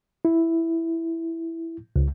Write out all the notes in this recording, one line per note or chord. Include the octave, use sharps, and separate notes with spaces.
E4
C#2